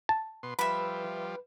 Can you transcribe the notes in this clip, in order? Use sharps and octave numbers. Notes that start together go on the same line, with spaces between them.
A5
B2 C6
F3 G3 B4 E5 B5